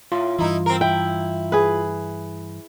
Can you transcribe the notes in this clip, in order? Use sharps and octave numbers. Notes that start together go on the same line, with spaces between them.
A2 F4
G2 E3 D#4 E4
C4 A#4
E4 G5
G#4 B4